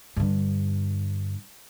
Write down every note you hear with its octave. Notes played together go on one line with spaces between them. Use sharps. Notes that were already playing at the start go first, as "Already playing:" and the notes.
G2 D3